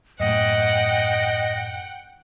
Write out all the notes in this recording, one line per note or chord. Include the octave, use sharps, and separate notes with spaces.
F#2 A2 D#5 F#5 G5